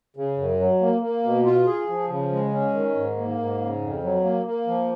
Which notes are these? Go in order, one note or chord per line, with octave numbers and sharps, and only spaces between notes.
C#3
F#2
F#3
A#3
A#3
B2
F4
G#4
F3
C#3
G#3
C#4
D#3
G#2
A#3
G#2
C#3
F2
F#3
A#3
A#3
F3